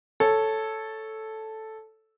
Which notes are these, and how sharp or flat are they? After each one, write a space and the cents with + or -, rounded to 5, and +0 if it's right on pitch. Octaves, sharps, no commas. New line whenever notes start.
A4 +0 C#5 +0